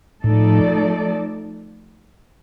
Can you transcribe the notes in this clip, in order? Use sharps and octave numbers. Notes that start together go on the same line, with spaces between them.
A2 F3 A3 D#4 A4 D5